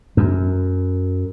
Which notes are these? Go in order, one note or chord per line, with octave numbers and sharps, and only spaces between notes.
F#2